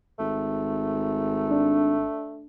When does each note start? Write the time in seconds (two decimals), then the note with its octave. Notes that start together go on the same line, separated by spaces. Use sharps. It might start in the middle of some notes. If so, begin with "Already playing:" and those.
0.19 G#1 A3
1.51 D4